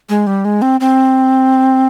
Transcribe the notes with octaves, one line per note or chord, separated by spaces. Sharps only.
G#3
G3
G#3
C4
C4